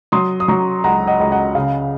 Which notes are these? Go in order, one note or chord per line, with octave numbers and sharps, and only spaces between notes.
F#3 C6 D#6
D#6
F#3 A#5 C#6
C#2 F#5 A#5
D#5 F#5
C#2
D#5 F#5
C#3 F5